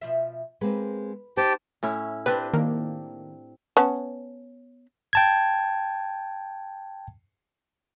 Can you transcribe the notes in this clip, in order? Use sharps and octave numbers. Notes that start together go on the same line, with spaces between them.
B2 F3 E5
G#3 A#3 C4 B4
D#4 G4 C5 G5 A5
A2 C#4 E4
C4 D4 G4 B4
D#3 A#3
B3 C#4 A5
G5 A5 G#6